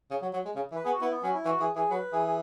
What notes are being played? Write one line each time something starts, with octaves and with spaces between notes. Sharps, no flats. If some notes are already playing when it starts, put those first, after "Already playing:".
C#3
F#3
F#3
G#3
C#3
E3
B4
B3 G#4
F#4
B3 E4
B3
F#3 C#4
E4
E3 F#4
E3 G#4
E3 G#4
F#3 B4
E3 G#4
G#4